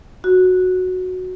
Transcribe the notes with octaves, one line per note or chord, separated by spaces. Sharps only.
F#4